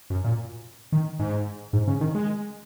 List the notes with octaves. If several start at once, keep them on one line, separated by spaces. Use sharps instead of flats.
F#2
A#2
D#3
G#2
G#2
C#3
D#3
G#3